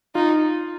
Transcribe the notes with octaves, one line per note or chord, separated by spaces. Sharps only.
D#4 F4